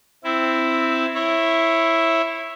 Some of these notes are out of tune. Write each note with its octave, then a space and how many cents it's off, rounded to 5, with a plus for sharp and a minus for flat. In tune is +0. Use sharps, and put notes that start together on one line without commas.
C4 +0 E4 +0
E4 +0 C#5 -25